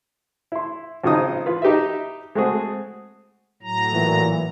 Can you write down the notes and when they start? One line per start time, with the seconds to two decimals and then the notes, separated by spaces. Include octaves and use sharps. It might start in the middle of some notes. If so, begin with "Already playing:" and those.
0.52 E4 C6
1.04 G#1 C#3 F3 D#4 D#6
1.46 E3 F4 B4
1.62 D#4 G4 B4 E5
2.35 G#3 A3 C4 F#4 G#4
3.62 A2 F#3 A#5
3.93 A#2 E3